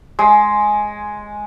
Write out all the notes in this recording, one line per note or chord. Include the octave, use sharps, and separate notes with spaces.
G#3